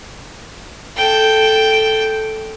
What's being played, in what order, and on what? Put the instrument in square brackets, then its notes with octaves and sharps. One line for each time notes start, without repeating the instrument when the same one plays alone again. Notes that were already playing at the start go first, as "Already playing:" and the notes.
[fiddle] A4 G5